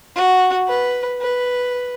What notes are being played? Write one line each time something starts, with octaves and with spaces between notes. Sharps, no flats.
F#4
B4
B4